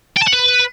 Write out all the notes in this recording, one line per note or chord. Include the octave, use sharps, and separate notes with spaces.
G5
A5
F#5
B4